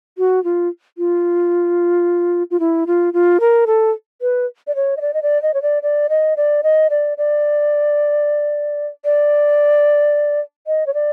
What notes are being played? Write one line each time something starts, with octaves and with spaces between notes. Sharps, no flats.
F#4
F4
F4
F4
E4
F4
F4
A#4
A4
B4
D5
C#5
D#5
D5
D#5
D5
D#5
C#5
D5
D5
D#5
D5
D#5
D5
D5
D5
D#5
C#5
D5